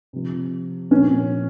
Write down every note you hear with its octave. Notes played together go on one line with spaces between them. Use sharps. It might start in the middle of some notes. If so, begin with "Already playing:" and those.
C3 F3
A#2 F3 C#4